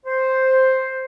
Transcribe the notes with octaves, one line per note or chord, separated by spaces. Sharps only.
C5